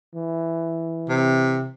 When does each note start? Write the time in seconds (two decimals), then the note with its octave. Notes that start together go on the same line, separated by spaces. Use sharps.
0.15 E3
1.09 C3